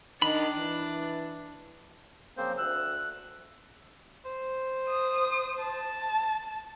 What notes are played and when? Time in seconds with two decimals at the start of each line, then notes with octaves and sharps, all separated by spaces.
0.22 D#3 D4 B5
0.58 E3
2.37 C#3 F3 A#3 C4 C5
2.58 D2 E6 F#6
4.25 C5
4.89 D#6
5.60 A5